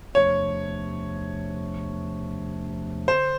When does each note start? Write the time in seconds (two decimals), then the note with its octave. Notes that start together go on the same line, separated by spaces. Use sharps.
0.15 E2 C3 F3 A3 D4 C#5
3.07 D3 C5